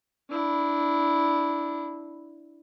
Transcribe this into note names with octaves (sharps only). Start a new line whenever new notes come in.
D4 E4